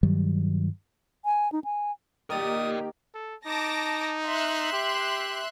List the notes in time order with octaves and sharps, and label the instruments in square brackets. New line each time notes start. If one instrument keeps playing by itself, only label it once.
[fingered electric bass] G2 D#3 F#3 G3
[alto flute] G#5
D#4
G#5
[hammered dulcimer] D#3 [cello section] A#3 G4 [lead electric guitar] A#4 D5 [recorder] D#6
[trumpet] A4
[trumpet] D#4 [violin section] A5 D6 A#6
[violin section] E5 C6 F#6
[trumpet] G4